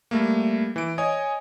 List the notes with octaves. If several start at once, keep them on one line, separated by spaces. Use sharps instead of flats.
G3 A3 A#3
E3 D7
C#5 D#5 G#5 D#6